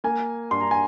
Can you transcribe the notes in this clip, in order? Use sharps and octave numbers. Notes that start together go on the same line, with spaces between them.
A#3 G#5
G2 C6
A#5
G#5